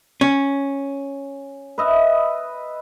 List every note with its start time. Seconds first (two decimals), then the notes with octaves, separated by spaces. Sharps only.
0.21 C#4
1.78 B4 D#5 E5